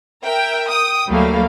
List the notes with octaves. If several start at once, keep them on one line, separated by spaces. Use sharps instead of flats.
A#4 E5 G5
G5 D#6
D2 F#3 G3 A3 A#3 F5